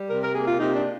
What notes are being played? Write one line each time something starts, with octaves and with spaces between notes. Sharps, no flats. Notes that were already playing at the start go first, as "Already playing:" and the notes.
Already playing: G3
C3 A#4
A#4
A#3 G#4
F4
C3 D#4
D4